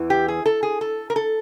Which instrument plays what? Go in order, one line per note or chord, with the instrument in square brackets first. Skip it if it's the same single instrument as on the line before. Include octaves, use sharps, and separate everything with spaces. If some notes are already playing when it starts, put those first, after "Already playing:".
Already playing: [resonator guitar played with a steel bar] E2 E3
G4
G#4
A4
G#4
A4
A#4
A4